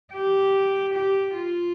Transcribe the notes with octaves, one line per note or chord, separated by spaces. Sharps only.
G4
G4
F4